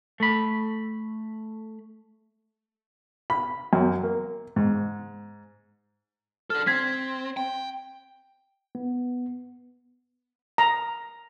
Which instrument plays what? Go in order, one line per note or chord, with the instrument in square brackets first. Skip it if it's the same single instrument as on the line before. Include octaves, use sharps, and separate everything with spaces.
[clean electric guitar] A3 B5
[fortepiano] B5
F#2
A#3
G#2
[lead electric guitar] D4 A4 [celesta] F6
[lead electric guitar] C4 [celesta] G#6 B6
[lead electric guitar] G5
[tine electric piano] B3
[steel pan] A#5